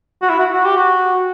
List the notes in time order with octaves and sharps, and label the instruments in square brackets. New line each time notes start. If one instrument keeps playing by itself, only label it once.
[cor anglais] F#4
E4
F#4
F#4
G4
F#4